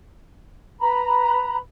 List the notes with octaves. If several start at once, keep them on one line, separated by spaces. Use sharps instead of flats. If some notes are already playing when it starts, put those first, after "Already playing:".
B4 A#5 B5